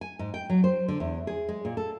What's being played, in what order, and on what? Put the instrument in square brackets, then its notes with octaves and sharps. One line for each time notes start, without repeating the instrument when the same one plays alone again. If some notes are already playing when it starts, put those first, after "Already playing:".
[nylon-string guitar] G#5
G#2
G5
F#3
C5
D3
E2
G#4
G#3
A#2
A4